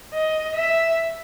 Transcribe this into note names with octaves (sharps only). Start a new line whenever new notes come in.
D#5
E5